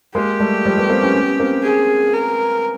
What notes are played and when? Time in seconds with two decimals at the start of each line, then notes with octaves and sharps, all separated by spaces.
0.15 G#3 A#3 G4
0.40 G3 A3
0.65 F3 G3
0.77 A3 B3
0.89 A#3 C4
1.02 B3 C#4
1.14 B3 C#4
1.40 A#3 C4
1.63 G#4
2.13 A#4